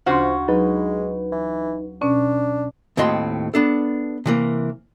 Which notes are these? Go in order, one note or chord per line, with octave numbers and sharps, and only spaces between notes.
D2 C#3 F3 D4 F#4 C6
F#3 G#3 D#4 B4
E3
B2 C#4 D4
D#2 A2 C4 F#4 D#5 C6
B3 D4 A4
C3 E3 A#3